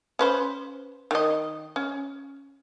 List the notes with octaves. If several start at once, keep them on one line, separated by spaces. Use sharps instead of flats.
C#4 B4 C5
D#3 D#5
C#4